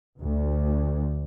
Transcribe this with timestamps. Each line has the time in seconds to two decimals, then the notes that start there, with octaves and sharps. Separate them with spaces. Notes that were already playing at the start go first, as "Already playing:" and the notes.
0.20 D2